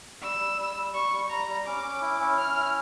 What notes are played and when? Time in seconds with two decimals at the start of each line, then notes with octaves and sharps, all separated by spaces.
0.22 G3 E6
0.39 G3
0.58 G3
0.76 G3
0.94 G3 C#6
1.12 G3
1.30 G3 A#5
1.48 G3
1.66 C#4 D6
1.83 C#4
2.01 E4
2.20 C#4
2.38 C#4 F6
2.57 E4